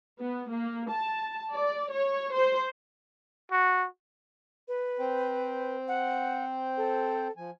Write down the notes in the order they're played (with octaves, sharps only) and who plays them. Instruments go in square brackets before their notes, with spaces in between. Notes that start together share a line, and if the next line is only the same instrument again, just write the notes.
[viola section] B3
A#3
A5
D5
C#5
C5
[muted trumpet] F#4
[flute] B4
[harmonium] C4 C5 G5
[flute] F#5
A4
[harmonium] F3 G#5